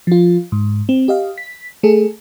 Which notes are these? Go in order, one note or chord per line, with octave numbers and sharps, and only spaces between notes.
F3 F4
G#2
C4
G4 D#5 F5
B6
A3 G#4 A4